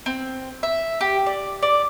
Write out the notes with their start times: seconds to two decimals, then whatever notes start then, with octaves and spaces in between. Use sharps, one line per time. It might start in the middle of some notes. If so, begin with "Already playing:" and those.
0.06 C4
0.63 E5
1.01 G4
1.26 D5
1.63 D5